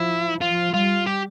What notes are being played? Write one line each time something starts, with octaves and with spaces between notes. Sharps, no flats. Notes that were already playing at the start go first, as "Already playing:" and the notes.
Already playing: F3 E4
F3 F4
G3 F4
G4